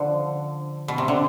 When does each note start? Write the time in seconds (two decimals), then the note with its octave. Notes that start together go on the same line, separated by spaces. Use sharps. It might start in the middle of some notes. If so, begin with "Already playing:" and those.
Already playing: D3 F3
0.88 B2
0.98 C3
1.08 D3